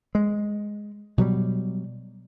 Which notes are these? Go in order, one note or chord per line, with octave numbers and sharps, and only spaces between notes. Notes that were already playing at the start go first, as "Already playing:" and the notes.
G#3
B2 F#3 G3